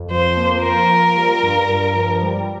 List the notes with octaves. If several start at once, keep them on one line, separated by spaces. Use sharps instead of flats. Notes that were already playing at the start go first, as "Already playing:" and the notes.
Already playing: F2
F3 C5
A#3
F4 A#4
F4
G3
G2
G2
F3
G3